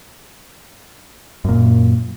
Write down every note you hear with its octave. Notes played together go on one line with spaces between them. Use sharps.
F#2 A#2